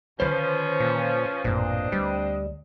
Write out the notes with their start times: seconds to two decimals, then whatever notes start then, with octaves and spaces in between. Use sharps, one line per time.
0.20 D3 D#3 F3 C#4 B4 C5
0.80 A#2
1.44 A1 F#2 A#2 C4 D4 D#5
1.92 D2 G3